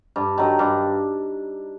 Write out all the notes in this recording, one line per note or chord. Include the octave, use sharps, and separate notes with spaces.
G2
D#3 F#3
G2